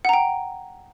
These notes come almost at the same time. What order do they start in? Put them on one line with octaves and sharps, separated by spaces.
F#5 A#5 G5